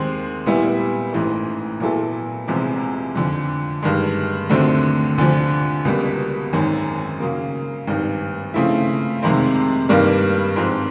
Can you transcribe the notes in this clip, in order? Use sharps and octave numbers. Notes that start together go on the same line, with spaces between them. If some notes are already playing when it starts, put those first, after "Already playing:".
Already playing: D#2 D#3 G#3 C4
A#2 G3 B3 E4
A1 G#2 E3 A3
A#2 F#3 B3 E4 A4
E1 E2 C3 F3 G#3
F2 D3 F3
G2 D#3 G#3
D#2 D3 F#3 A3 C4
D2 D3 F3
C#2 B2 G3 A#3
G#1 F#2 D#3 G#3 C#4
C#3 F#3 A#3
G#1 G2 D#3
C#3 F3 A3 C4 E4
F2 C3 D#3 G#3 C4
G2 D#3 G3 A#3
G#2 F3 G#3 C4